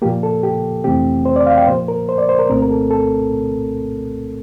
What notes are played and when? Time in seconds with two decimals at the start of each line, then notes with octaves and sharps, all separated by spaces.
0.02 A#2 F3 A#3 G4
0.23 A4
0.43 G4
0.84 F2 C3 E3 A3 C4 G4
1.25 C5
1.36 D5
1.46 F5
1.57 G5
1.67 A#2 F3 A#3 C5
1.88 A#4
2.09 C5
2.18 D5
2.29 C5
2.39 A#4
2.49 C2 A#2 A3 C4 A#4
2.62 A#4
2.71 A4
2.91 A4